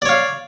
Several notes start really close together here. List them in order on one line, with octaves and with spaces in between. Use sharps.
D5 C#5 F5